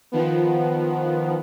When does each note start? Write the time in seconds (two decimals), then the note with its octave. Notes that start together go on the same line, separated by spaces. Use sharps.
0.12 D#3 F3 B3